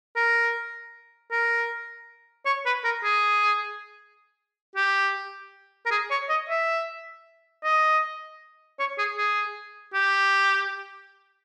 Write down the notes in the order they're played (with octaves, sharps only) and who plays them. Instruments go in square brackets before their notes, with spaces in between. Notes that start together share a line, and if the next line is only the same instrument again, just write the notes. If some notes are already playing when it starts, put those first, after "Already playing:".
[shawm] A#4
A#4
C#5
B4
A#4
G#4
G4
A#4
G#4
C#5
D#5
E5
D#5
C#5
G#4
G#4
G4